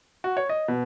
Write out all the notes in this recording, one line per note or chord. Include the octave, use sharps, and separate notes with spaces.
F#4
C#5
D#5
B2